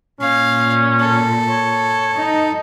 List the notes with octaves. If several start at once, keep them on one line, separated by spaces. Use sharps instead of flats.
A#2 C#4 F5
A4
C#5
D#4